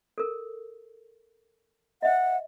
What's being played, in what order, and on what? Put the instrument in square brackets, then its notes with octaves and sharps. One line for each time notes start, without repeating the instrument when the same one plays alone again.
[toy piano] A4 A#4
[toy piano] D#5 E5 [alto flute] F#5